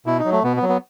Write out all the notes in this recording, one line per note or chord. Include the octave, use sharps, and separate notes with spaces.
B2 E4
D#4
F#3
A3
B2 B3
B3
F#3
B3